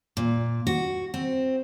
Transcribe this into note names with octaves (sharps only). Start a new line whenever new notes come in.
A#2
F#4
C4